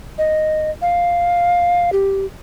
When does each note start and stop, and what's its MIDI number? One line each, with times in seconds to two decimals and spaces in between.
0.18 0.71 75
0.82 1.90 77
1.93 2.26 67